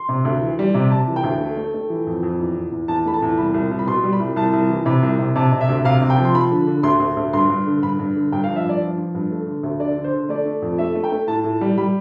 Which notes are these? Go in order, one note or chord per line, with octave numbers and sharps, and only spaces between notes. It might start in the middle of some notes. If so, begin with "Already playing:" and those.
Already playing: C6
C3
D2
E3
G3
C3
C3 A5
E3
G5
D2
A3
A3
A3
E3
F2
F2
E2
E2
E2
E2 A5
A3 B5
A5
E2
C2 B5
C2
C2
B5
B2 C6
G3
B5
C2
C2 A5
C2
E3
C3 B5
C2
C3
C3 A5
C3
E5
D2
C3 F5
C3
G5
F3
C6
F3 B5
D3
D3
D2 C6
D2
D2
G2 C6
G2
D3
G2 B5
G2
D3
G2 G5
F3 F5
E5
G2 D5
F3
F3
G2
A3
D3
D2
D3 D5
D3
C5
D3
A3 D5
A3
F2
A3 E5
A3
G5
A3
A2 A5
A2
G3
G3 B5